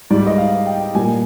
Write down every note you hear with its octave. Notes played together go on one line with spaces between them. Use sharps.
G#2 G3 D5
D#5
F5
G5
A#2 G3 G#5